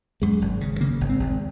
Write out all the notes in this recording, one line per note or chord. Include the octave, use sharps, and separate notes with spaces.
F#2 G#3
G#1
C#3
C#3 A#3
G#1
C4
G#1